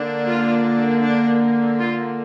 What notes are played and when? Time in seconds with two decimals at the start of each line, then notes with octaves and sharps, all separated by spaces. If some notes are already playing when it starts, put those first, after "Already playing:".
Already playing: D3 A#3 D4
0.27 F4
1.02 D4
1.78 F4